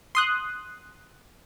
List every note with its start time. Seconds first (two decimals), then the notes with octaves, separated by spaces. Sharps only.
0.15 C6 D#6 F#6